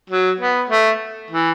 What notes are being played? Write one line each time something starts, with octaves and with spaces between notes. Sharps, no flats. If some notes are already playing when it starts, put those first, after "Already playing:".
F#3
B3
A3
E3